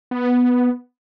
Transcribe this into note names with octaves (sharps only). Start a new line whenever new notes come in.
B3